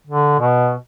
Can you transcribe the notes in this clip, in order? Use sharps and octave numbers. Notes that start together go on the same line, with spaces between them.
D3
B2